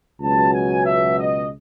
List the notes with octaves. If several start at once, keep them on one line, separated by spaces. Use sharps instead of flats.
C#2 B2 F#3 A5
G#5
E5
D#5